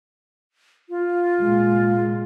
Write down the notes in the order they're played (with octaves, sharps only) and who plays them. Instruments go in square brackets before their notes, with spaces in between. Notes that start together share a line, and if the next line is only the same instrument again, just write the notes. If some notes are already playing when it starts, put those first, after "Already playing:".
[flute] F4
[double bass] A#2 G#3